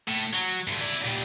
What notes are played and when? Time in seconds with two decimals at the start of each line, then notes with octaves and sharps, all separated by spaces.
0.08 A2
0.33 F#3
0.67 G2 D3
0.81 E4 D5
1.04 A#2 G3